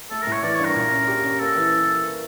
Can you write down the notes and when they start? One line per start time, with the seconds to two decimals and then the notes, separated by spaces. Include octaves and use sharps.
0.10 A3 A4
0.22 A2 A#4
0.33 C#5
0.43 E3 D5
0.55 G2 C#5
0.65 A#4
0.76 A#2
0.92 C#4
1.08 G4
1.24 C#4
1.40 A#3 A4
1.56 E3